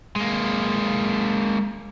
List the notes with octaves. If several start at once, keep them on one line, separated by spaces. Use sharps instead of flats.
G#3 A#3